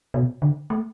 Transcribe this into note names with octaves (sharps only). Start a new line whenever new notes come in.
B2
D3
A3